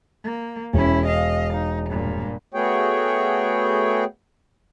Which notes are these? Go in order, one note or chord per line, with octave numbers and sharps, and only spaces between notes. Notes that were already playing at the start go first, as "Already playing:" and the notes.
A#3
E1 C#4 E4
D#5 F5
D#4
G2 A#2
A3 B3 F#4 G#4 C#5 G5